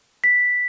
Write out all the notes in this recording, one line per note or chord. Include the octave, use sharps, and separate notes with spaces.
B6